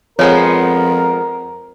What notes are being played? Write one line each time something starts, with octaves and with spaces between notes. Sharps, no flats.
F2 F3 G#3 B3 A#4 C#5